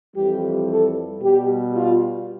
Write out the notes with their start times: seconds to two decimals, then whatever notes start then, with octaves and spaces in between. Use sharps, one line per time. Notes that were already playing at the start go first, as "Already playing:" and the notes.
0.15 F2 E3 G3 G4
0.68 A4
1.22 B2 G3 G4
1.74 F4